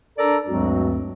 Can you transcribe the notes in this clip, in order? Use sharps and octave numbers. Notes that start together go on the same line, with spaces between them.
D4 A4 A#4 D5 A#5
D2 G2 F#3 G#3 C4 F#4